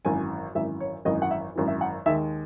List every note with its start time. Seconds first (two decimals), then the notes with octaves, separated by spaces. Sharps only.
0.05 G#1 F#2 E3 G#5
0.55 G#1 F#2 E3 E5
0.80 C#5
1.05 G#1 F#2 E3 D#5
1.22 F#5
1.31 E5
1.55 G#1 F#2 E3
1.68 E5
1.81 F#5
2.06 D#2 D#3 G#3 E5